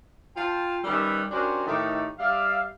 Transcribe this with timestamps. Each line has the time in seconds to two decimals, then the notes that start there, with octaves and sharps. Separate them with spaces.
0.37 F4 G5 A5
0.84 D#3 G3 C#4 B4 D5 E5
1.31 C#4 D4 F#4 G4 A#4 C5
1.66 A2 D#3 A3 D#4 G4
2.19 G3 D5 E5 F5